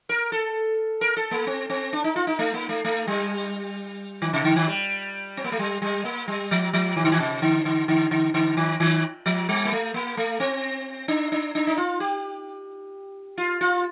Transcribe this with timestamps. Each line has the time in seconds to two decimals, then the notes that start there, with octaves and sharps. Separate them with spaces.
0.09 A#4
0.32 A4
1.01 A#4
1.17 A4
1.31 A#3
1.47 C4
1.70 C4
1.93 D4
2.04 D#4
2.16 F4
2.27 D#4
2.39 A3
2.54 A#3
2.69 A3
2.84 A3
3.07 G3
4.22 D#3
4.33 C3
4.44 D3
4.56 D#3
4.68 G3
5.37 C4
5.44 A#3
5.52 A3
5.59 G3
5.82 G3
6.05 A#3
6.28 G3
6.51 F3
6.73 F3
6.96 D#3
7.04 D3
7.12 D#3
7.19 C3
7.42 D3
7.65 D3
7.88 D3
8.11 D3
8.34 D3
8.57 D#3
8.80 D#3
9.26 F3
9.49 G3
9.65 A#3
9.72 A3
9.94 A#3
10.17 A3
10.40 C4
11.08 D4
11.32 D4
11.55 D4
11.67 D#4
11.77 F4
12.00 G4
13.38 F4
13.61 F4